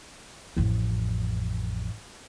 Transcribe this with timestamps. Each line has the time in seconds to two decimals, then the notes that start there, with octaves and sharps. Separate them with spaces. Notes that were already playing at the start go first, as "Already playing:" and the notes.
0.57 A1 F2